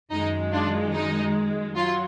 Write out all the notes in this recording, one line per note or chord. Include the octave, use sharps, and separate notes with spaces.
F#2 D#3 G#3 D#4
D4 F4
D#4
F#3 F4